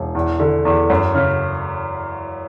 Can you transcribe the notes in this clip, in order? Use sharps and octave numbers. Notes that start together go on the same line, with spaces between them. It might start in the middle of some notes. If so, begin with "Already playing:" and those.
Already playing: E1
E2
D3
E2
F#2
C#3